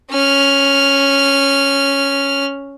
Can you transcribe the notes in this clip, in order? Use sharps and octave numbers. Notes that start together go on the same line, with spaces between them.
C#4 F6